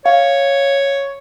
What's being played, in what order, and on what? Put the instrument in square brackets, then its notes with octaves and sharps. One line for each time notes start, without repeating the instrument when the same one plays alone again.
[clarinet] C#5 [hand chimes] F5